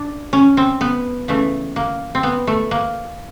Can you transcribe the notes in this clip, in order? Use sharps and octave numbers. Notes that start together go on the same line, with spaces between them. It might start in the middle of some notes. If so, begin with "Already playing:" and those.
Already playing: D4
C#4
C4
B3
C#3 E3 A3
A#3
C4
B3
A3
A#3